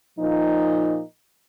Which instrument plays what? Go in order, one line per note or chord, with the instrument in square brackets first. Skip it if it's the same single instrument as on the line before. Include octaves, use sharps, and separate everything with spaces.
[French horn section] A#2 F3 D#4